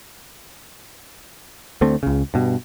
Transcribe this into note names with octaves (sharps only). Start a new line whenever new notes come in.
D2 D3 A3 C4
C#2 C#3
G2 B2